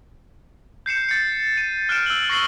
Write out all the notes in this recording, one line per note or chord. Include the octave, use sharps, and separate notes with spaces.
G6 C7 C#7 E7
A6 C#7
D#7
F6 F#6 C#7 D7 E7
E6 F#7
C#6 A#6 C7 F#7 G7